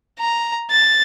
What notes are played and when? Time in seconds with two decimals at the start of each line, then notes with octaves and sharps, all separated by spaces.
0.20 A#5
0.71 A6